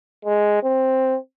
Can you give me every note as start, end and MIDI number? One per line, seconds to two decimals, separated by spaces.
0.25 0.60 56
0.63 1.17 60